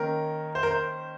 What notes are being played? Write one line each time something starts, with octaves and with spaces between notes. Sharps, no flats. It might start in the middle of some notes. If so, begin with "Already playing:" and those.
Already playing: D#3 A#3 C#4 A#4
C5
A#4
C5